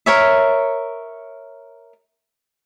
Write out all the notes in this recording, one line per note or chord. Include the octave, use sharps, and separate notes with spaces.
A#4 C#5 E5